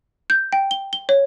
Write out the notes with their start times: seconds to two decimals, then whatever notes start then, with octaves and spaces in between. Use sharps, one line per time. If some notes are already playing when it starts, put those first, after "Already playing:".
0.30 G6
0.53 G5
0.71 G7
0.93 G7
1.09 C#5